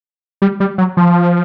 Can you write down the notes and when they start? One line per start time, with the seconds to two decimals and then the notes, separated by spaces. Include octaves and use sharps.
0.42 G3
0.60 G3
0.78 F#3
0.97 F3